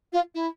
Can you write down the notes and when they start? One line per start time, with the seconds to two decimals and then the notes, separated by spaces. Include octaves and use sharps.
0.13 F4
0.35 E4